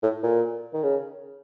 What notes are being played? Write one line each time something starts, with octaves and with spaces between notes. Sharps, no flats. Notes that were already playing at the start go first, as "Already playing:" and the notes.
A2
A#2
D#3
C#3